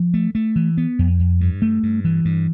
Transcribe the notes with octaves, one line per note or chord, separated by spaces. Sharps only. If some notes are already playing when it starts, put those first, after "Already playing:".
Already playing: F3
A3
A3
E3
B3
F2
F2
G2
A3
G2
E3
G2